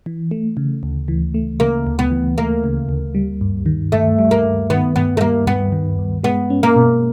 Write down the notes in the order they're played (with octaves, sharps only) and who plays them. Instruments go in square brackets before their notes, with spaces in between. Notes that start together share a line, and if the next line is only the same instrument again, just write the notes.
[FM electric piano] E3
A3
C#3
D2
E3
A3
[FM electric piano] C#3 [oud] A#3
[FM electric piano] D2
[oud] B3
[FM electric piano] E3
[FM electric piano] A3 [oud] A#3
[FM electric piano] C#3
D2
G3
G2
D#3
[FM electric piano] G2 [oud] A3
[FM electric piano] G3
[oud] A#3
[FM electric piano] G2
[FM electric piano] D#3 [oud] B3
[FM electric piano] G2 [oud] B3
[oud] A3
[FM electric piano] G3 [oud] A#3
[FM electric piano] G2 [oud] B3
[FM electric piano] D#3
G2
[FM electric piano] G#3 [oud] B3
[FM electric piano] C#4
[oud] A#3
[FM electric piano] B2